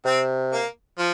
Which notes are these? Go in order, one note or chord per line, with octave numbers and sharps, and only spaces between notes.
C3 C4
A#3
F3